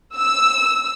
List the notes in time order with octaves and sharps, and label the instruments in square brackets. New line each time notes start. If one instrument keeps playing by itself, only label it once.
[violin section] E6